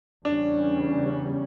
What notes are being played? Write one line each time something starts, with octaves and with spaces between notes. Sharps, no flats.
E2 C#3 G3 C#4 D4